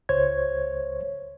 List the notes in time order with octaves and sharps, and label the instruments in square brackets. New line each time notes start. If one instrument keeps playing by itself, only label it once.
[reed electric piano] C#2 C5 C#5 G#6